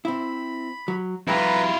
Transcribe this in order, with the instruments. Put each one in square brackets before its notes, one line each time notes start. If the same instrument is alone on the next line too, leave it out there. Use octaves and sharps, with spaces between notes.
[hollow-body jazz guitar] C4 E4 [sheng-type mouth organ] B5
[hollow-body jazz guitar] F#3
[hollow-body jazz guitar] F2 G3 G4 [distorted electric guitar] E4 F4 [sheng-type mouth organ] B4 A#5